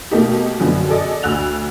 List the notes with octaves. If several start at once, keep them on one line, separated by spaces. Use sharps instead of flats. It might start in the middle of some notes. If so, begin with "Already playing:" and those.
B2 A3 A#3 D#4 G4
F#2 D3 F3 B3
G#4 A4 D5 D#5
D2 E6 F#6 F7